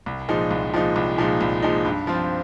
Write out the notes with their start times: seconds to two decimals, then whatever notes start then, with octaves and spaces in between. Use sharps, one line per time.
0.06 C2
0.28 A#2 F3 G#3 D#4
0.51 C2
0.74 A#2 F3 G#3 D#4
0.96 C2
1.18 A#2 F3 G#3 D#4
1.41 C2
1.63 A#2 F3 G#3 D#4
1.85 G2
2.07 F3 C4 F4